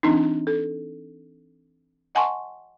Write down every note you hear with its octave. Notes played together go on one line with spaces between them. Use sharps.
E3 C4 D4 D#4
A4
D#5 F#5 G#5 A5 C6 C#6